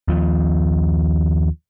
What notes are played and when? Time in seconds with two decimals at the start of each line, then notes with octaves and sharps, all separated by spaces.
0.08 D#2 F3